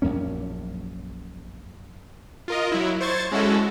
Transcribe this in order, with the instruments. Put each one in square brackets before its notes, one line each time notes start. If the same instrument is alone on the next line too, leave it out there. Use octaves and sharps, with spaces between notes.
[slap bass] A#1 F#2 A#3 C#4
[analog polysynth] F4 A#4 D#5
F#3 E4
C5 C#6 G#6 A6
G#3 C#4 E4 F#4 A4